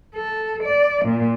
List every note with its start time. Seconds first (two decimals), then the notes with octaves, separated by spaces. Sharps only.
0.15 A4
0.64 D5
1.05 A#2